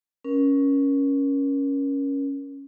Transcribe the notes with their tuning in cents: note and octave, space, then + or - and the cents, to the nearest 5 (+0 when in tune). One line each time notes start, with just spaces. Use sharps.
C#4 +0 A#4 +30